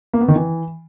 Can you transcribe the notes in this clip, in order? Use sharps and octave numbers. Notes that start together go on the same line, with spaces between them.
A#3
B3
D#3
E3